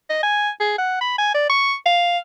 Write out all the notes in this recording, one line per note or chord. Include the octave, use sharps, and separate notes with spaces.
D#5
G#5
G#4
F#5
B5
G#5
D5
C#6
F5